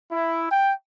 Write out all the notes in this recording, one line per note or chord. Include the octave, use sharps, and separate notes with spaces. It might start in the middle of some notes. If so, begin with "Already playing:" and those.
E4
G5